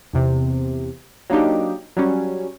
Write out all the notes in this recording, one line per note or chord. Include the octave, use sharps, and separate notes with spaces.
E2 C3
F#3 A#3 D4 D#4 G4
F#3 G3 C#4